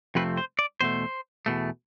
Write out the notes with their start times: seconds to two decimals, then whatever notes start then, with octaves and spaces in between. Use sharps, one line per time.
0.15 F2 C3 F3 A3 C4 B4
0.37 C5
0.59 D5
0.81 E2 B2 A3 C5
1.46 E2 B2 A3